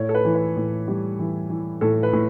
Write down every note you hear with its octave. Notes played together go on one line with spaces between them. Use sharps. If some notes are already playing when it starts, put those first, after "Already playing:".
Already playing: A2 C#5
A4
B4
E3
B4
A2
G3
E3
E3
A2 A4
B4
A2